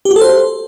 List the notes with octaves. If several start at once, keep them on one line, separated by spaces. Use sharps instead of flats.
G4
F#4
A4
C5